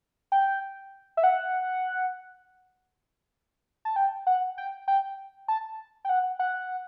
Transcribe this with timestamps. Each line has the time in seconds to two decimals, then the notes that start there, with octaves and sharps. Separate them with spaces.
0.32 G5
1.17 E5
1.24 F#5
3.85 A5
3.96 G5
4.27 F#5
4.58 G5
4.88 G5
5.48 A5
6.05 G5
6.09 F#5
6.39 F#5